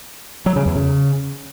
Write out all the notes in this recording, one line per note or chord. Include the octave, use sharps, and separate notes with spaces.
F#3
C#3
E2
C#3